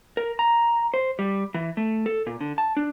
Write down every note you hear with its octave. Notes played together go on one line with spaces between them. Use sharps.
A#4
A#5
C5
G3
E3
A3
A4
A#2
D3
A5
D4